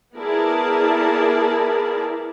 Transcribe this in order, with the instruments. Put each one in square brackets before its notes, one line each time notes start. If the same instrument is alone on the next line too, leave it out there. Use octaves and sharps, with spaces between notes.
[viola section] B3 E4 G#4 A#4 D5 A5